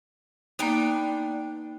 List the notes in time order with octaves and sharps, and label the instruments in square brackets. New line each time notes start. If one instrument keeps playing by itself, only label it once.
[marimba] A#3 D#4 [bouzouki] B3 D4 G5